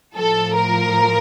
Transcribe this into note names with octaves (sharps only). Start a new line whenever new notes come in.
A2 F3 A4
A#4